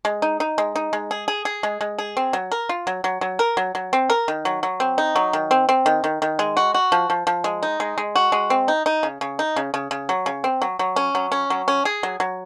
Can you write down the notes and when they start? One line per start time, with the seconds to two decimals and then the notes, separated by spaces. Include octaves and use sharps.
0.05 G#3
0.22 D#4
0.40 D#4
0.58 G#3
0.76 D#4
0.93 G#3
1.11 G#4
1.28 G#4
1.45 G#4
1.63 G#3
1.81 G#3
1.99 G#4
2.17 C4
2.33 F#3
2.52 A#4
2.69 F4
2.87 F#3
3.04 F#3
3.21 F#3
3.39 A#4
3.57 F#3
3.75 F#3
3.93 C4
4.10 A#4
4.28 D#3
4.45 F#3
4.63 F#3
4.80 C4
4.98 D#4
5.16 F#3
5.33 D#3
5.51 C4
5.69 C4
5.86 D#3
6.04 D#3
6.22 D#3
6.39 G#3
6.57 F#4
6.74 F#4
6.92 F3
7.10 F3
7.27 F3
7.44 G#3
7.63 D#4
7.80 G#3
7.98 G#3
8.16 F#4
8.32 G#3
8.50 C4
8.68 D#4
8.86 D#4
9.03 C#3
9.21 C#3
9.39 D#4
9.56 C#3
9.74 C#3
9.91 C#3
10.09 F#3
10.26 C#3
10.44 C4
10.62 F#3
10.79 F#3
10.96 C#4
11.15 F#3
11.32 C#4
11.50 F#3
11.68 C#4
11.85 G#4
12.03 F#3
12.20 F#3